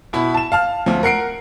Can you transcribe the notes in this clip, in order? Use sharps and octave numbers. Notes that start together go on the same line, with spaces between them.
B2 E4 B5
A5 E7
F5 A5 F6
D2 F3
A#4 F#5 C7 D7